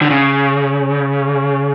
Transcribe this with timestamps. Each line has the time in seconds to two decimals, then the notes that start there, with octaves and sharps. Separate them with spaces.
0.02 D3
0.11 C#3